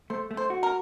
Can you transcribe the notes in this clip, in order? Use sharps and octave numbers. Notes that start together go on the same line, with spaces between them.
A3 C5
A3
C5
F#4
A#4